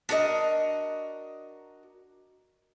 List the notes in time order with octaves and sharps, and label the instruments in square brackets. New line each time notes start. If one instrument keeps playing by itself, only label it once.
[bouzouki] D4 F#4 A#4 D#5